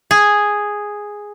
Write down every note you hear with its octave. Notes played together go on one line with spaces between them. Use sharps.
G#4